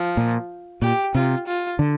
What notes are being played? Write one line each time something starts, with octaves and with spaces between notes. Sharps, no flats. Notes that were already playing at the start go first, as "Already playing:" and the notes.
Already playing: F3
A#2
A#2 G4
C3 F4
F4
D3